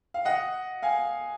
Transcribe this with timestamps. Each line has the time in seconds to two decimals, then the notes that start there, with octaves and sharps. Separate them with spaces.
0.14 F5
0.25 D#5 F#5
0.82 F5 G#5